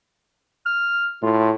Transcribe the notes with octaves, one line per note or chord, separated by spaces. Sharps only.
F6
A2 F4